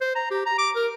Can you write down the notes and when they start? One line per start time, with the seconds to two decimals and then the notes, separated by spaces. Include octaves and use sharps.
0.01 C5
0.16 A#5
0.31 G4
0.46 A#5
0.59 D6
0.75 A#4